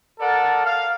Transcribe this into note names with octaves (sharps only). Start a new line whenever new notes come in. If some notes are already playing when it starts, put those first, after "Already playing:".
A4 A#4 D5 F#5
F5